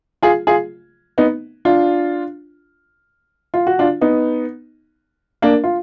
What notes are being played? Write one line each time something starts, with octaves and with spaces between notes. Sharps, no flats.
F4 G#4
F4 G#4
B3 D#4
D4 F4
F4
F#4
D4 F4
B3 D#4
A#3 D4
F4